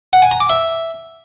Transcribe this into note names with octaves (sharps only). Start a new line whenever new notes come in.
F#5
G#5
A#5
D6
E5